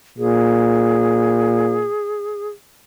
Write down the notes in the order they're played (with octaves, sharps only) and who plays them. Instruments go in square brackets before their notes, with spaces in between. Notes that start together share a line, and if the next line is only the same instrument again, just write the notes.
[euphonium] A#2 [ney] G#4